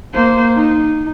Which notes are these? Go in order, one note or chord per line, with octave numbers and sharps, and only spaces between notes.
A#3 C5
D#4